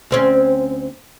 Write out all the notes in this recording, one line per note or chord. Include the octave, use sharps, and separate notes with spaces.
D2 C4 C#4